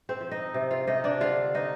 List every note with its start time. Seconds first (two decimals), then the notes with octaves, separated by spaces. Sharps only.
0.09 C4 C5
0.21 F3
0.31 D#4 D#5
0.54 C3
0.71 F4 F5
0.87 C3 D#4 D#5
1.04 D4 D5
1.21 D3 F4 F5
1.54 D#4 D#5